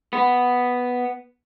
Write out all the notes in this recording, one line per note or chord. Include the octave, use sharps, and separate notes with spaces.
B3